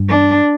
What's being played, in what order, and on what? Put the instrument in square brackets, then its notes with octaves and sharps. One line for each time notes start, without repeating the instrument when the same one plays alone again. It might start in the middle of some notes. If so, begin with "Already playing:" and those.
Already playing: [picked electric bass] G2
[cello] D4